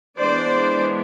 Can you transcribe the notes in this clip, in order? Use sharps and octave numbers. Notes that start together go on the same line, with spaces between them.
E3 G#3 B3 D4 C5 D5